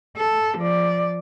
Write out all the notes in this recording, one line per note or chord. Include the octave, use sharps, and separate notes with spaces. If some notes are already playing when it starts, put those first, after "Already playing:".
A4
F3 D5